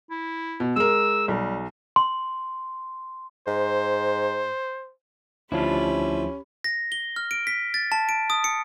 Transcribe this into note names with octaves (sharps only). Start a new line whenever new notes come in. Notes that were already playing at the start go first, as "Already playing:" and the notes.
E4
B2
G#3 A#4 E6
B1 G3
C6
G#2 C5
D2 F3 C#4 D4 E4 F4 G4 B5
A#6
G7
F6
D7
B6
A6
A5
D7
D#6
C#7